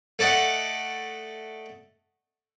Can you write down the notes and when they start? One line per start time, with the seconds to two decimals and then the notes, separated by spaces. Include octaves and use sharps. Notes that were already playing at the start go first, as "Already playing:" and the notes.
0.19 A3 D5 D#5 F#5